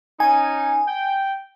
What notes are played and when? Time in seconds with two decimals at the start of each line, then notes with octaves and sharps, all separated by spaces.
0.20 C#4 D#4 G#5
0.88 G5